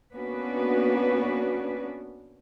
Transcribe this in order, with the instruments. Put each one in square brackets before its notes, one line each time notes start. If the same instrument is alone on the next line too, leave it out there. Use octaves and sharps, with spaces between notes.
[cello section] A#3 B3 C#4 D4 F#4 B4